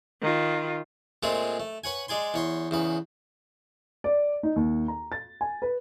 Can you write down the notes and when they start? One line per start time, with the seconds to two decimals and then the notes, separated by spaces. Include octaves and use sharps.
0.22 D#3 F4
1.23 A#2 G#3 A3 C4 F4 G#4
1.60 A3
1.84 B4 C#5 F#5 G#5
2.08 G#3 D5 G#5 C6
2.34 E2 C#5 C6
2.71 E2 C#3 B4
4.04 D5
4.43 D#4
4.56 D#2
4.88 A#5
5.12 A6
5.41 G#5
5.62 B4